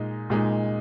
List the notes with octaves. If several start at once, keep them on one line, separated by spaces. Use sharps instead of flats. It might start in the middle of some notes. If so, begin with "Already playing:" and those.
Already playing: A#2 G#3 D#4
A#2 G#3 D#4